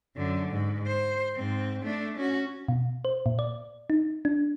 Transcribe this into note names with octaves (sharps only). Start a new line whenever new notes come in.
F#2 D3
G#2
C5
G#2 C4
A3 D4
C#4 F#4
B2
C5
A#2
D5
D#4
D4